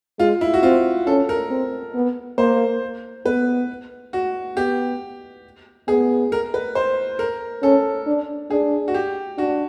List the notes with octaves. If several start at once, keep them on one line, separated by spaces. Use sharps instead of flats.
G#3 F4
E4
F#4
C4 F4
C#4 A4
A#4
C4
B3
A#3 C5
B3 B4
F#4
B3 G4
B3 G#4
A#4
B4
C5
A#4
C#4 A4
D4
D4 G#4
F#4
G4
D4 F#4